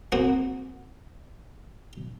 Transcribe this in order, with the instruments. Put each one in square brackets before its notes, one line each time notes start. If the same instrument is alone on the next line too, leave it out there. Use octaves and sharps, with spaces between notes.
[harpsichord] A#3 C4 F#4 G#4